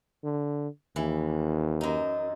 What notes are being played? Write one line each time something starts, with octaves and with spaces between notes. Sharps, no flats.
D3
D#2 E3
F#2 D#4